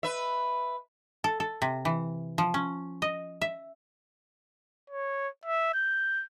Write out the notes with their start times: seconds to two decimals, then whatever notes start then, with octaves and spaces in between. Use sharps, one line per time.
0.03 B4 E5
1.24 A4
1.40 A4
1.62 C3
1.85 E3
2.38 F3
2.54 C#4
3.02 D#5
3.41 E5
4.90 C#5
5.46 E5
5.74 G6